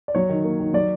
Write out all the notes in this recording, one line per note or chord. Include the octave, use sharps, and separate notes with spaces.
D5
F#3 C#5
D#3
A#3
D#3
F#3 D5